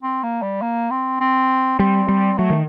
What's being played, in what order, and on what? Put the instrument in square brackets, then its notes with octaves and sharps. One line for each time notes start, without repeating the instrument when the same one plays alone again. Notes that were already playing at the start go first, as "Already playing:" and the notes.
[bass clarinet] C4
A#3
G3
A#3
C4
C4
[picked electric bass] G3 [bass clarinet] C4
[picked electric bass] G3
[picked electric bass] F#3 [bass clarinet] A3
[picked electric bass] D#3